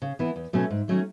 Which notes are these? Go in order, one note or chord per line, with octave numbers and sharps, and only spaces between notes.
C#3
E3 B3 E4
E2
B2 F#3 A3 C#4
G#2
D#3 F#3 A3 C#4